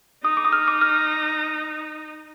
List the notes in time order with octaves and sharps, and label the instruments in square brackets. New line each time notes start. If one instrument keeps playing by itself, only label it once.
[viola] D#4 [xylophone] D#6
[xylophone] D6
D#6
F6
D6
F6